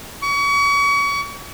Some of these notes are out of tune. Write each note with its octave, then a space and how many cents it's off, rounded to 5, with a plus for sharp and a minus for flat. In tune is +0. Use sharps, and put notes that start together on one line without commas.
C#6 +35